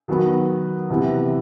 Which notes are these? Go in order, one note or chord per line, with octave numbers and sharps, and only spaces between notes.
D#3 F#3 B3
C3 E3 B3